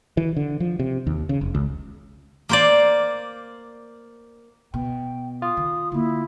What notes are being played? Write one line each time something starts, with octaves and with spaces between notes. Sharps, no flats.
E3
D3
F3
C3
D#2
C#3
F1
C#2
A#3 C5 D5
B2 G5
F4 D#6
D#3
D3 A#3 E4